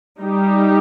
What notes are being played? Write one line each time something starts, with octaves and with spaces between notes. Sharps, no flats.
G3 D#4 G4